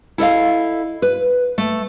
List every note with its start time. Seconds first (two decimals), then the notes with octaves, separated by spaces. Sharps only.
0.18 E4 A4 D#5 F5
1.02 B4
1.58 A3